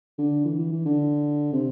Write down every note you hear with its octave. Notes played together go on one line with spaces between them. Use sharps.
D3
E3
E3
E3
D3
C3